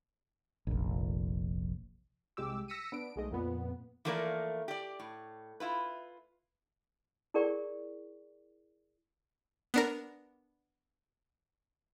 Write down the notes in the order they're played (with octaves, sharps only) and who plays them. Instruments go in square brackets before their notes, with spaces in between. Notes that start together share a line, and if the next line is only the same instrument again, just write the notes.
[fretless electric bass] F1 A#1
[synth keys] C2 G#3 G4 D6 E6
E6 A#6 B6 C#7 D#7
B3 D4 D7
B1 G#3 A3 D#5
F2 A#2 B3
[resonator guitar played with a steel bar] E3 F3 A3 A#3 A#4 D5
G4 D5
A2
E4 F4 B4
[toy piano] E4 G#4 A#4 D5 G5 C#6
[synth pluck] B3 D4 A#4